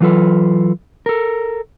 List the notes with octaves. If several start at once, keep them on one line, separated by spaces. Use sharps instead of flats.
E3 F#3 F4 A4 B4
A4 A#4